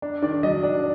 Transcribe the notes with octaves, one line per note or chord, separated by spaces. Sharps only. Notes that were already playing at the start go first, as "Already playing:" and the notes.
D4
D#3 D5
F#3 D#5
D4 D5